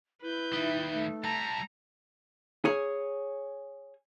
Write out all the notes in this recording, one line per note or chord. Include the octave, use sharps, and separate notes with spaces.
E4 B4 G6
D#2 G3 D#4 E5
A3
G3 E4 A5 A#5
G#4 C#5